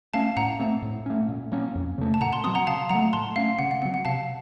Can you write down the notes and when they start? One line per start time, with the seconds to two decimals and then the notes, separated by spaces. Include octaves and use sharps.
0.13 A3 C#4 F5 A5
0.37 A2 F#5 A#5
0.60 A3 C4
0.82 A2
1.06 A3 C#4
1.29 A#2
1.52 F#3 A#3 C#4
1.75 F2
1.98 C#3 A3
2.14 A5
2.21 A#2 F#5 A#5
2.32 A5 C6
2.44 F#3 C4 C6 D#6
2.55 F#5 A#5
2.67 C#3 F5 A5
2.89 F#3 A3 F#5 A#5
3.13 A2 A5 C6
3.36 A3 C#4 F5
3.59 C#3 F#5
3.71 F#5
3.82 F#3 C4 F#5
3.94 F#5
4.05 C3 F5 A5